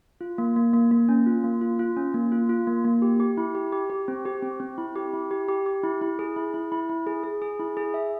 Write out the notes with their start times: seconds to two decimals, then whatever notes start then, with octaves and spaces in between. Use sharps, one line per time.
0.21 F4
0.38 A#3
0.56 A#3
0.73 A#3
0.91 A#3
1.09 C#4
1.26 F4
1.44 A#3
1.61 F4
1.79 F4
1.97 C#4
2.14 A#3
2.32 F4
2.49 F4
2.67 A#3
2.84 A#3
3.02 G4
3.20 G4
3.37 E4
3.55 G4
3.72 G4
3.90 G4
4.08 C4
4.25 G4
4.43 C4
4.60 C4
4.78 E4
4.96 G4
5.13 E4
5.31 G4
5.48 G4
5.66 G4
5.83 E4
6.01 E4
6.19 G#4
6.36 E4
6.54 E4
6.72 E4
6.89 E4
7.07 G#4
7.24 G#4
7.42 G#4
7.59 E4
7.77 G#4
7.94 E5